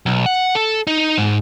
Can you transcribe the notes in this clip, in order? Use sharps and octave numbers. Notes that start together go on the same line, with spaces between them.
B1
F#5
A4
D#4
G#2